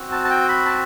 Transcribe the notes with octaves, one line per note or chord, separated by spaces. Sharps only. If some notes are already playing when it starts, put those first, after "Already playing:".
Already playing: C4 F#4
A5
A5
G5
B5
A5